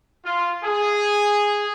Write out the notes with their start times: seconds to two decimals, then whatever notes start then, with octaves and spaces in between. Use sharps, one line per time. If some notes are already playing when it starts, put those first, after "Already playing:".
0.25 F4
0.64 G#4